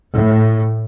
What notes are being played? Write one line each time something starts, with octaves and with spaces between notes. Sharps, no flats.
A2